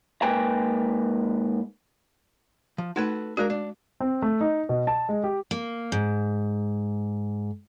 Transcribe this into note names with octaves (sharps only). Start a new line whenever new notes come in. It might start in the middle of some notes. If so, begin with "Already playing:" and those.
G#2 A#3 B4 G5 G#5 A#5
F3
A3 D#4 F#4 A4 B4
G#3 D4 F#4 G#4 A#4
D4
C4
A3
D#4
B2
A5
G#3
G4
A#3
G#2